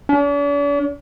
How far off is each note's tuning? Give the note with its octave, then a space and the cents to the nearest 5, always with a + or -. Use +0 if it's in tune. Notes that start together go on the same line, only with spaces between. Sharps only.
D4 -45